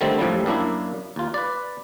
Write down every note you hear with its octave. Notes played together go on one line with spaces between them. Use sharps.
D3 D#3 G3 A3 C4
F#2 A2 F3 G3
F#2 A#3 D4 E4
D#2 F4
B4 D5